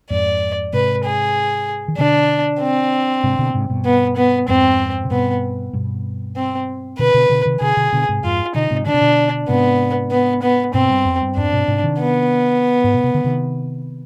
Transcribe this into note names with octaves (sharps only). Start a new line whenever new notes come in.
F2 G#2 D5
G#2 C3 B4
G#4
D#3
B2 D3 D4
C4
G#2 C3
B2 D3
G#2 C3
G2 B2
B3
B3
F2 G#2 C4
C3
G2 B2 B3
G2 B2
C4
B2 D3 B4
B2 D3
B2 D3
C3 D#3
B2 D3 G#4
B2 D3
B2 D3
G#2 C3
F2 G#2 F4
B2 D3 D#4
G#2 C3
D3 D4
C3
B2 D3
G#2 C3 B3
B3
B3
G2 B2 C4
G2
F2
G2
F2 G#2 D4
G2 B2
G#2 C3
C3 D#3
B3
G#2
B2
C3
D3
C3 D#3